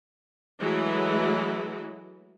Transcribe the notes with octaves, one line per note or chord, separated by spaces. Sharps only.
E3 F#3 G#3 A3 E4